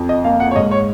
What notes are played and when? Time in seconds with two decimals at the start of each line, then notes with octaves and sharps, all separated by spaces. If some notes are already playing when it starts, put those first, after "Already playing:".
Already playing: F2
0.09 D#5
0.24 A#3 F5
0.40 F#5
0.51 C#5
0.56 G#2 D#5
0.71 C#5